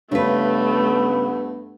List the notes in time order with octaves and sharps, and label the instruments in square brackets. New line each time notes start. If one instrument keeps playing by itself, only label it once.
[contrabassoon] G2 [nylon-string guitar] C#3 B4 [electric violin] A3 [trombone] B3